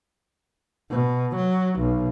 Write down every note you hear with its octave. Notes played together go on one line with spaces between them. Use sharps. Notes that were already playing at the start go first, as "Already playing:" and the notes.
B2
F#3
B1